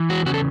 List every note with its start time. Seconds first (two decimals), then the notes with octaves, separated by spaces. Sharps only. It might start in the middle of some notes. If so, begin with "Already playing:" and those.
Already playing: E3
0.10 E2 F#4
0.26 C#3 F#4
0.34 A4